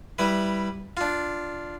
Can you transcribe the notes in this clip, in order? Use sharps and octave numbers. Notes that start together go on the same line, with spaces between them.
G3 E4 B4
D4 F4